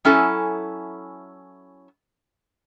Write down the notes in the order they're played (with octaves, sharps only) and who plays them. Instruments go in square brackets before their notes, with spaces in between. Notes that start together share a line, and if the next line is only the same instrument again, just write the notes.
[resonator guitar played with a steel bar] F#3 C#4 E4 A4 G#5